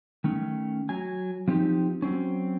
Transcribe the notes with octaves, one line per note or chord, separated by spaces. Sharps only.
D#3 A3 C#4
F#3 G#5
F3 C4 D#4 G4
F#3 C4 C#4